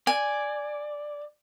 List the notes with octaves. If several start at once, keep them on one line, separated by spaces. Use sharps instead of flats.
D5 G#5